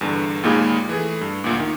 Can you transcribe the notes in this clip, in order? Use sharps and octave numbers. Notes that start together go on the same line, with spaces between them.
E2 G2 D3
D#2 A#2 D#3 G#3 G#4 B5
E3 A3 G#4
G2
D2 A#2
D#3